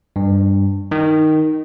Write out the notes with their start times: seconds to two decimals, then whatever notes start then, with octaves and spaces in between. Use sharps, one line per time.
0.16 G2
0.91 D#3